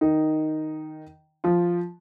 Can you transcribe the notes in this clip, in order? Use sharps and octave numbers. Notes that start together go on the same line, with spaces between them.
D#3 D#4
F3 F4